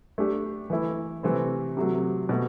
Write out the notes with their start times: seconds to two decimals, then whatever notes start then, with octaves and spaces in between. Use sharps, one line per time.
0.18 A3 D4 G4
0.70 E3 A3 E4
1.23 C3 E3 A3 C4
1.77 C3 F#3 A3
2.29 B2 A3